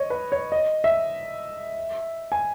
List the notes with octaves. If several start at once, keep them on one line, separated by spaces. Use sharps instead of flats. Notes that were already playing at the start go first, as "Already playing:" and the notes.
Already playing: C#5 D#5
B4
C#5
D#5
E5
G#5